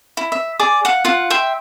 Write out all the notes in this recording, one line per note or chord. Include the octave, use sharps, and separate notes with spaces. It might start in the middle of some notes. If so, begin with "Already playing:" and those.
E4
E5
G#4 D5 D6
F5 F#5
F4 F5 F#5
E5 G5 C6